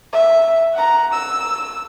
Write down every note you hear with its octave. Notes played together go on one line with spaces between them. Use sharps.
E5
F#5 A#5
E6